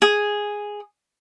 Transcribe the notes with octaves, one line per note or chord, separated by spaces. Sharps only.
G#4